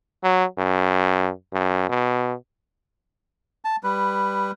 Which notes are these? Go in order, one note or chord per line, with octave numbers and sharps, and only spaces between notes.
F#3
F#2
F#2
B2
A5
G3 B4